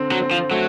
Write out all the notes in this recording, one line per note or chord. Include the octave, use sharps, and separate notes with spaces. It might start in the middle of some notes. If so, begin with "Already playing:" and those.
Already playing: D3 C4
F#3
C4
F3
F#3 A3